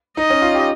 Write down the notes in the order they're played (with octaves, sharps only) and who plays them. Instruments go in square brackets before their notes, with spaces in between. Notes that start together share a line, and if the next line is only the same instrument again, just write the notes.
[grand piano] D#4 [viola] D#5
[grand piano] C#4
F4
G4